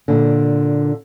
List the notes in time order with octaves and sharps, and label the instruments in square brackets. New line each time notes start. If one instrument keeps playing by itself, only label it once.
[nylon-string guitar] A#2 D3